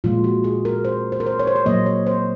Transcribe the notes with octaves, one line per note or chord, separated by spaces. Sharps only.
A#2 F3 G#3 F4
F#4
G#4
A#4
C5
C5
A#4
C5
C#5
C5
C#5
A#2 F#3 A#3 D#5
C#5
C5